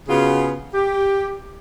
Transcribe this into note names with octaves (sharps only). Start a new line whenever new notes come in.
C#3 B3 F4 F#4 G#4
G4